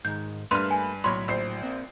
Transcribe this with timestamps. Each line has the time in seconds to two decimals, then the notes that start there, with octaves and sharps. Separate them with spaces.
0.05 G#2 D#3 G#3 G6
0.51 G2 A3 A#3 D4 B4 B5 C6 F6
0.71 G#5
1.04 B1 A2 F#3 C#5 B5 C6
1.28 A#1 C5 C7
1.63 A#3 C4